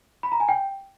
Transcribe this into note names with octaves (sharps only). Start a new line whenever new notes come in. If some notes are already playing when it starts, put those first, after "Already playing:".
B5
A#5
G#5
G5